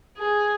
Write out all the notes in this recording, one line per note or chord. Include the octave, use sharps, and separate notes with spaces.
G#4